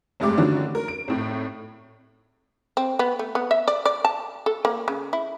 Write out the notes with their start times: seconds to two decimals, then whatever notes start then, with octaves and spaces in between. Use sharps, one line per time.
0.20 F1 G2 G#3 A3 G4 D6
0.38 D3 D#3 F3 F#3 C#4 D4
0.75 A#4
0.88 D7
1.08 G#1 A2
2.77 C4
2.99 B3
3.19 A3
3.35 B3
3.51 E5
3.68 D5
3.85 D5
4.05 A5
4.46 A4
4.65 A#3
4.88 C#3
5.13 E4